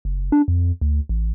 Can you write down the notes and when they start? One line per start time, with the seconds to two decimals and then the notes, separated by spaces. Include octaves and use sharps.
0.05 F#1
0.32 D4
0.48 F2
0.81 D2
1.09 A1